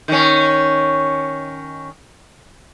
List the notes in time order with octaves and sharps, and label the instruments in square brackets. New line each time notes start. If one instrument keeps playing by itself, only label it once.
[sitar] D#3 C#4